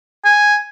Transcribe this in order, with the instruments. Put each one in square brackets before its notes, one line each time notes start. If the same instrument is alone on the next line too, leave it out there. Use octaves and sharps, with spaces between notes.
[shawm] G#5